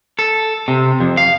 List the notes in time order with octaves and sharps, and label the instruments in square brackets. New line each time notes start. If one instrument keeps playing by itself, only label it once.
[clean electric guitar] A4
C3
F2
F5